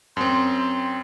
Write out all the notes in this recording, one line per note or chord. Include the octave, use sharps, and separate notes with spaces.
F#2 C4 C6